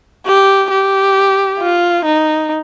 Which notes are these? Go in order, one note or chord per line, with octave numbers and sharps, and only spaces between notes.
G4
G4
F4
D#4